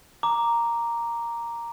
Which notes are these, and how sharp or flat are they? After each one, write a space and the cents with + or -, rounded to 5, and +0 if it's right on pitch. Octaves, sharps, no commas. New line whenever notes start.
A#5 +0 D6 +0